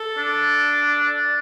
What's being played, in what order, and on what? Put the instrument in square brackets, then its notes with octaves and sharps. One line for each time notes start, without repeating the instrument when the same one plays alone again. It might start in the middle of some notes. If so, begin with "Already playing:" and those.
Already playing: [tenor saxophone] A4
[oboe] D4